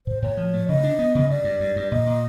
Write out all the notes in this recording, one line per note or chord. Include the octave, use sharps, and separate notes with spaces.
A2 C5
A2 C#5
F3
A3
C#3 D#5
D4
B3
C#3
G2 D5
G2
G2
G2
A#2 D#5
A#2